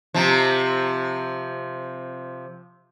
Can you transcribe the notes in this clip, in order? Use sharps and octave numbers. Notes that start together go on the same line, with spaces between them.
C3 F3